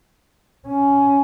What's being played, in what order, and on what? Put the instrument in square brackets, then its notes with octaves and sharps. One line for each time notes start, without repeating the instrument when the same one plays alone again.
[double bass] C#4